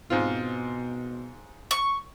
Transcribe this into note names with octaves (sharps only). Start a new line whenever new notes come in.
G#2 B2 C4 F4
C#6